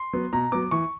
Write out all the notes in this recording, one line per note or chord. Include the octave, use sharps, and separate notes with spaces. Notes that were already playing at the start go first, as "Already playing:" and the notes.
Already playing: C6
F#3 B3
B2 A#5
F#3 B3 D6
E3 C#6